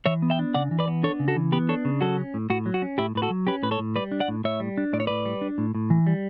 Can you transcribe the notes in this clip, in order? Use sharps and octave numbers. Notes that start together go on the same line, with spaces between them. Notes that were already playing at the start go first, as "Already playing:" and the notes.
E3 C#5 E5
B3
E5 G5
D4
C#3 D5 F#5
E3
B4 D5
B3
D4 A4 C#5
C#3
F#4 A4
E3
B3 G4 B4
D4 A4 C#5
C#3
F#3 F#4 A4
C#4
A2
A2 F#4
F#3
F#4
C#4
A2 E4 G4
A2 B4
F#4 A4
F#3
C#4 G4 B4
A2 B4
A4 C#5
A2
G3 B4 D5
D4
D5 F#5
A2
A2 C#5 E5
G3
D4
A2 D5
C#5
A2 B4 D5
G3
D4
A2
A2
E3
G3